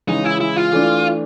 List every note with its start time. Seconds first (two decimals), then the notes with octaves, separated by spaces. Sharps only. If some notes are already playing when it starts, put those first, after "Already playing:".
0.08 C#3 E3 G#3 C#4 D#4
0.24 E4
0.41 E4
0.56 F4
0.72 E3 A3 D4